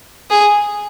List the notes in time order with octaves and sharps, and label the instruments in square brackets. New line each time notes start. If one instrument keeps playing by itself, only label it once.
[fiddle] G#4